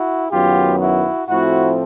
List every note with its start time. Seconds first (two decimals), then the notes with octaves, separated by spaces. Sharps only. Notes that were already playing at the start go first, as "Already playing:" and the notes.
Already playing: E4 F#4
0.31 F#2 D#3 F#3 B3 F4 G4
0.80 E4 F#4
1.28 A2 F3 A3 C4 E4 F#4